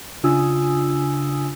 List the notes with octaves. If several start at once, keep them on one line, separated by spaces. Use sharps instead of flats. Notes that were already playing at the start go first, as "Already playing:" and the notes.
C#3 D4 F4 G#5 D#6 E6